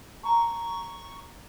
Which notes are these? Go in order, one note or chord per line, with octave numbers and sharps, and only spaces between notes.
A5 A#5 C6 C#6